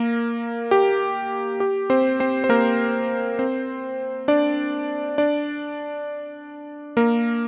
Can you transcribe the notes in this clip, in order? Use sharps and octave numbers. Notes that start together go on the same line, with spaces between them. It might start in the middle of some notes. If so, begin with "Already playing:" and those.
Already playing: A#3 A#4
G4
G4
C4 C5
C4 C5
C5
A#3 A#4
C4 C5
D4 D5
D4 D5
A#3 A#4